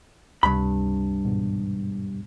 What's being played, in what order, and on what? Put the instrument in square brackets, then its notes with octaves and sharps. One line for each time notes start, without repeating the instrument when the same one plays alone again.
[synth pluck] C#2 C3 [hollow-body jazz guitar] G2 B5
[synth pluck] E2 G#2 B2